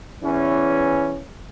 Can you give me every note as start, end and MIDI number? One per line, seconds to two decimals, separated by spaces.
0.24 1.23 40
0.24 1.23 52
0.24 1.23 61